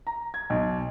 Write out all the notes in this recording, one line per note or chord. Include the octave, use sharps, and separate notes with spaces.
A#5
G#6
B1